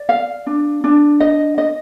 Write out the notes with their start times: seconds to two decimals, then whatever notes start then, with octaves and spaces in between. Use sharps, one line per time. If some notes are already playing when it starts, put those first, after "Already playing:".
Already playing: D5
0.09 F5
0.47 D4
0.84 D4
1.20 D#5
1.58 D#5